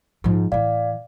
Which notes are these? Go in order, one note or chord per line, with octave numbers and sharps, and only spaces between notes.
G#2 F3
A2 E3 D5 F5